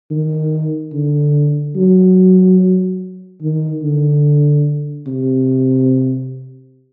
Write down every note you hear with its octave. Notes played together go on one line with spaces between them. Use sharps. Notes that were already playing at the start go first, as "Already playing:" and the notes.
D#3
D3
F#3
D#3
D3
C3